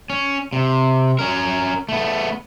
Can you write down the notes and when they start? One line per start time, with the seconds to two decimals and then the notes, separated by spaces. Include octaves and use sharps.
0.10 C#4
0.53 C3
1.19 C#4 A#4
1.89 A3 B3